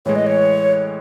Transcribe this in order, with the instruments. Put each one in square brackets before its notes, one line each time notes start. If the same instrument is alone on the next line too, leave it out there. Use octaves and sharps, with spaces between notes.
[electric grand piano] A2 E3 G#3 [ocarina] C#5
[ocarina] D#5
C#5